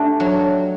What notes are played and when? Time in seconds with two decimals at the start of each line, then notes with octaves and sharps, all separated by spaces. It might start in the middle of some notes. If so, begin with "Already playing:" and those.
Already playing: A3 D4 G4
0.20 F#3